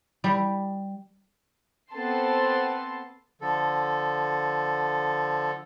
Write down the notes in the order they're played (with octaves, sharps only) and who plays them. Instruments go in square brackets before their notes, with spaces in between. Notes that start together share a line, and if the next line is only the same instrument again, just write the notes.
[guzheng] G3
[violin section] B3 C4 A4 A5 C6
[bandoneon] D3 F3 A4